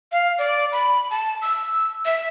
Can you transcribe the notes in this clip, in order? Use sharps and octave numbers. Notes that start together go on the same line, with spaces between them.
F5
D5
B5
A5
E6
E5